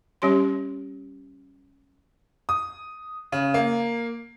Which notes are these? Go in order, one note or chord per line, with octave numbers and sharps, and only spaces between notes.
G3 C#4 G4 C#5 C6
D#6
C#3
A#3